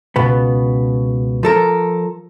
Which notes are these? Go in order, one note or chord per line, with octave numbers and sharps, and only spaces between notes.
C#2 B2 B3
F3 A4 A#4